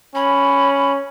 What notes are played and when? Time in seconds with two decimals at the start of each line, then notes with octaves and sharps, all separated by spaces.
0.15 C#4 B5